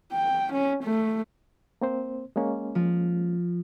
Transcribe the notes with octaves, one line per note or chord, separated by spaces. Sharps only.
G5
C#4
A3
A#3 C4 C5
G#3 A#3 C#4
F3